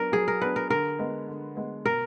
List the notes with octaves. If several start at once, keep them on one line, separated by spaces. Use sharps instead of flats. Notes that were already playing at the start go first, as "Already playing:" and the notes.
Already playing: F#3 B3 D4 A#4
F#3 G#4
A#4
B3 D4 B4
A#4
D3 A#4
G#3 B3
D3
G#3 B3
B2 A#4